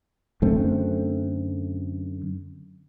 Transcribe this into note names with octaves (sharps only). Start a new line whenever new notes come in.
F#2 D3 A3 C4